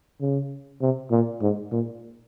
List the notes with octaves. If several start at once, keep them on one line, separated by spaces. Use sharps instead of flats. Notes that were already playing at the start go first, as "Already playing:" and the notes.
C#3
C3
A#2
G#2
A#2